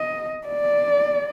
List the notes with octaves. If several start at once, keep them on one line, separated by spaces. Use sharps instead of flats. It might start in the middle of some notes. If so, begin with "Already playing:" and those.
Already playing: D#5
D5